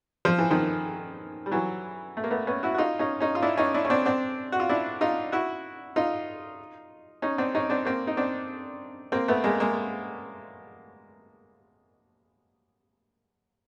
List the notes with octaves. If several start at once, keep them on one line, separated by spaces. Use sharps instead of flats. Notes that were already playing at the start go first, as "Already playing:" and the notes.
F3
E3
D#3 F3
G3
E3 F#3
A3
A#3
A3 B3
B3 C#4
E4 F#4
F#4
D#4 F4
C#4 D#4
C#4 D#4
F4
D4 E4
C#4 D#4
D4 E4
C#4
C4 D4
C4 D4
F#4
F4
D4 E4
D#4 F4
E4 F#4
D#4 F4
C#4 D#4
C4 D4
C#4 D#4
C4 D4
A#3 C4
D#4
C4 D4
A#3 C4
A3 B3
G#3 A#3
G#3 A#3